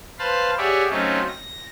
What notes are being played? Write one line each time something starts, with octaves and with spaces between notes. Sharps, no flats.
B4 C5 F5 A5 B5 C6
G4 G#4 C#5 D5 E5 F#5
F#3 A3 C4 C#4 D#4 F4
A#6